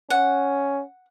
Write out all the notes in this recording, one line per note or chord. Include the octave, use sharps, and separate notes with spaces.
C#4 F#5